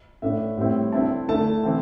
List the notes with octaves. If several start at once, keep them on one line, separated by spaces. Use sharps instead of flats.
A2 A3 D4 E5
A2 G3 C4 E4
D3 C4 E4 A5
D3 A3 E4 A5
E3 C4 E4